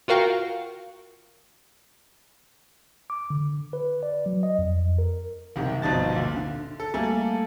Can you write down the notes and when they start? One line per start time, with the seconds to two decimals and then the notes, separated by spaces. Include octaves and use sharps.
0.08 F4 F#4 A#4 F5 G5 C#6
3.10 D6
3.30 D3
3.73 B4
4.03 D5
4.26 F#3
4.43 D#5
4.59 F2
4.98 A#4
5.56 F#1 C2 D#3 G4
5.82 G1 B2 F3 D#4 A5 A6
6.12 D2 A#2
6.36 D3
6.80 A4
6.94 G3 A3 A#3 A4 G#5